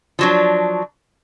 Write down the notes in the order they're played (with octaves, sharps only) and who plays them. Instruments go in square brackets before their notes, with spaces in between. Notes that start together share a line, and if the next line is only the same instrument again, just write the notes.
[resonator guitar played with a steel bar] F3 F#3 D4